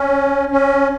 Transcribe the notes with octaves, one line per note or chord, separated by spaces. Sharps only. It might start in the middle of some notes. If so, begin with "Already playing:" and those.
Already playing: C#4
C#4